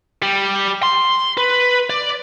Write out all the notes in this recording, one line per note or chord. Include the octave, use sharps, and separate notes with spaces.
G3
C6
B4
D5